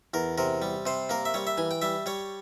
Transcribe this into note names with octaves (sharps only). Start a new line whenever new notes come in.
E2 A#4
C3 A#4
G3
C3 C5
A#3 A#4
E5
G3 C#5
E5
E3 G#5
G5
G3 E5
G3 C#5